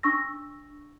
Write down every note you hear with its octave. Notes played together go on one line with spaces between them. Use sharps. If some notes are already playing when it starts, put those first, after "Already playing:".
D4 C#6 E6 A#6